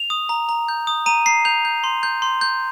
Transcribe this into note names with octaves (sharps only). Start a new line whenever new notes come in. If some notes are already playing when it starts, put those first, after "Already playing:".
Already playing: F7
D#6
A#5
A#5
G6
D#6
A#5 D#7
A#5 C7
G6 F7
G6
C6
G6
C6
G6